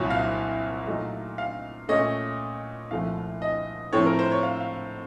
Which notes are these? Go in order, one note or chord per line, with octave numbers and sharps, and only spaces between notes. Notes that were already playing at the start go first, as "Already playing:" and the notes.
Already playing: C2 A#2 F#3 C#5
F5
A#2 F#3 A3 D#4
F5
A#2 A3 C#4 D#5
C2 A#2 F3 A3 F5
D#5
A2 F3 A3 C4 C#5
A#4
C5
C#5
F5
F5